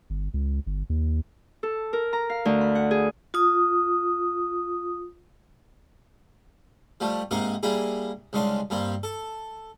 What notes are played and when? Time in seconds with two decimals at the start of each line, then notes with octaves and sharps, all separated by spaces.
0.10 G1
0.34 C#2
0.67 G1
0.90 D#2
1.63 A4
1.93 A#4
2.13 A#5
2.29 F5
2.45 D2
2.61 B5
2.75 F#5
2.91 G#4
3.34 F4 D#6
7.00 F3 G3 A3
7.31 G#2 C3 A#3 D#4 A#4 F5
7.63 G3 A#3 D4 E4 G#4
8.33 C2 C#3 G#3 D4 C6
8.70 G2 G3 A#3 C4
9.03 A4